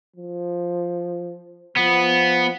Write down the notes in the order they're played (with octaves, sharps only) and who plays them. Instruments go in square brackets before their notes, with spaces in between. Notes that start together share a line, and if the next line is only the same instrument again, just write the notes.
[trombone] F3
[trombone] F3 [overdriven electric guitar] B3